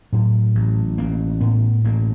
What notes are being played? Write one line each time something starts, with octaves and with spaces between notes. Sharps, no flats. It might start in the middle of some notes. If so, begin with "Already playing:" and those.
A2 F#3
A1
A1 A#3
A2 B3
A1 A#3